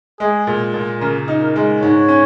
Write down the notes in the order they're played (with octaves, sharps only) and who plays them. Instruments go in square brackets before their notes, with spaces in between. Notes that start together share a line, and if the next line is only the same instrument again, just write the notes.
[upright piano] G#3 [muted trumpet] G#4
[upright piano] A#2
A#2
[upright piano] C#3 [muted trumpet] A#4
[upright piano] D#4
[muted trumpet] A#4
[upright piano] G#3
[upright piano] G#2 [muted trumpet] C#5
[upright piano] C#4